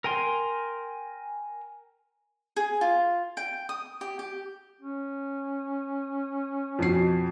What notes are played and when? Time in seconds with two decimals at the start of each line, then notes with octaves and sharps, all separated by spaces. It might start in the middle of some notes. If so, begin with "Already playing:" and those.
0.04 A#4 G5 G#5 C6
2.56 G#4
2.81 F4
3.37 G5
3.69 D#6
4.01 G4
4.19 G4
4.81 C#4
6.79 F2 B2 C7